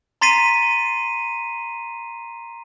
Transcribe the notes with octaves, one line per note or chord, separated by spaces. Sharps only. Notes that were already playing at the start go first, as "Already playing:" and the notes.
A#5 C6 A6 B6 C7 D#7